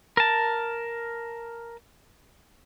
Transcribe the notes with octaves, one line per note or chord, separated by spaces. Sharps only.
A#4 A5